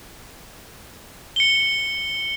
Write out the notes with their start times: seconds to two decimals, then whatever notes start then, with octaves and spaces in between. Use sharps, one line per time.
1.36 C#7 G7